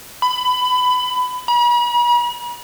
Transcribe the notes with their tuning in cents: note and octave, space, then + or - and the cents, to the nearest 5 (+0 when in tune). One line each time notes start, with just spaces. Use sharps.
B5 +20
B5 -45